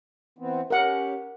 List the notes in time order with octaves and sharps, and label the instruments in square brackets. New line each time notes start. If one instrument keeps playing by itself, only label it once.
[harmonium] E3 B3 C4
[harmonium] C#4 G4 [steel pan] A#4 F#5